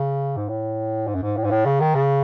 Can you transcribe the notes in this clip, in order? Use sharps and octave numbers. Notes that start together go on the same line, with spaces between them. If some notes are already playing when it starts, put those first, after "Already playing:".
Already playing: C#3
G#2
A2
G#2
F#2
G#2
A2
G#2
A2
C#3
D#3
C#3